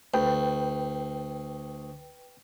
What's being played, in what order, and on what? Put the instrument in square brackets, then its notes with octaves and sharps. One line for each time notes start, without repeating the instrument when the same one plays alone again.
[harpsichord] D2 [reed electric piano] B4 G5